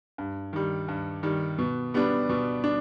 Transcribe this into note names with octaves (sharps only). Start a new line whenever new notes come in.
G2
D#3 G3
G2
D#3 G3
B2
G3 B3 D4
B2
D4